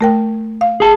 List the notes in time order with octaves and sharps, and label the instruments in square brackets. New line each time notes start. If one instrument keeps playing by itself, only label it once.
[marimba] A3 A#4 G5
F5
[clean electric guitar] G#4 A5